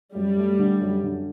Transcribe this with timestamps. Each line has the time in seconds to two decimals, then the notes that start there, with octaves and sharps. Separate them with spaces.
0.14 F#2 G3
0.37 A3
0.59 D3
0.81 F#2
1.04 D3